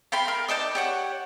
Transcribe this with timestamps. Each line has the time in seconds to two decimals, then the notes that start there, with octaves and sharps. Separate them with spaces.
0.12 F5 G5 B5 C6
0.28 A#4
0.48 D#4 D5 A5 G6
0.75 G4 C#5 F#5